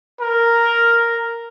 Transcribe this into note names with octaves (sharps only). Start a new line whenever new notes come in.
A#4